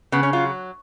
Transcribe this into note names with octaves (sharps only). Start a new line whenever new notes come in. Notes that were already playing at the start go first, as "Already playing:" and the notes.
C#3 B3
C#4
F#3 F4